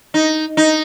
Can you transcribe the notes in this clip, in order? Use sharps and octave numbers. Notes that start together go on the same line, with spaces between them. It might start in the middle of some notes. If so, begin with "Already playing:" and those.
D#4
D#4